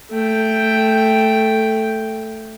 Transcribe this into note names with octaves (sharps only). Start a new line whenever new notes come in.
A3 G5